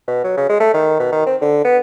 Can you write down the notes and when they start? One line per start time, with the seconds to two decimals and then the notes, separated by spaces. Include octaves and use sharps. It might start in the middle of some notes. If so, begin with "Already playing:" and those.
0.07 B2
0.24 F#3
0.37 C#3
0.49 G#3
0.60 A3
0.74 D#3
0.99 B2
1.12 D#3
1.26 C4
1.42 D3
1.64 B3